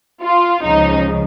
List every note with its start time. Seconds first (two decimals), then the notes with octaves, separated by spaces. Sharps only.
0.23 F4
0.63 C#2 C#3 F3 D#4